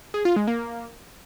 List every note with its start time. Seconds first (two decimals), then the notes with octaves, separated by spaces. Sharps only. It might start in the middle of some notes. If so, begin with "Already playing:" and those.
0.14 G#4
0.25 F4
0.36 G#3
0.48 A#3